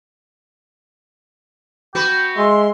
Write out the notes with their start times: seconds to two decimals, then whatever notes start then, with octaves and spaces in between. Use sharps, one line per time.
1.95 B3 F#4 B4 G5
2.37 G#3 E5 C6